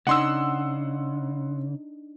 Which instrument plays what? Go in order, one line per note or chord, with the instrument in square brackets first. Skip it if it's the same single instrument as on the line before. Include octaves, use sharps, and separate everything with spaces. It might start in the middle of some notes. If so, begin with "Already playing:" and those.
[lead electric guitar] C#3 [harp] D4 D#4 D#5 [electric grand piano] F#5 C6 E6